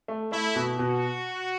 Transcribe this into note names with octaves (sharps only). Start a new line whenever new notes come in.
A3
A3 E4
B2
B2 F#4